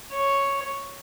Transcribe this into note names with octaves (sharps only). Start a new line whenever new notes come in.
C#5